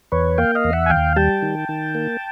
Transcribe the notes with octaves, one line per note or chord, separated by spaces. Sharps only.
E2 B4 C#5
A#3 F5 G5
D#5 F5
E2
E5 F#5
G#5
D#2 F5 G5
G3 G5 A5
D#3
D#3
A#3